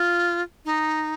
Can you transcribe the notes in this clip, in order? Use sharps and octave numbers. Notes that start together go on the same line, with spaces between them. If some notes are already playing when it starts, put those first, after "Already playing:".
Already playing: F4
D#4